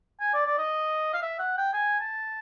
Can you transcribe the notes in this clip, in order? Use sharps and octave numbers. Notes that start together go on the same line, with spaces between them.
G#5
D5
D5
D#5
F5
E5
F#5
G5
G#5
A5